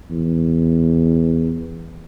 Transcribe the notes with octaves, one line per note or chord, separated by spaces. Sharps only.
E2